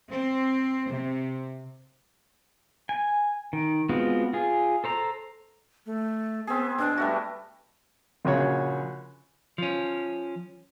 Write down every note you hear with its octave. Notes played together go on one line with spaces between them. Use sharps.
C4
C3
G#5
D#3
G#3 B3 C4 F4 F#4
F4 G#4
A4 C5 A#5
A3
B3 C4 G#4
B2 D4
G3 A3 F#4
A#1 C#3 F#4 C#5
F3 C#4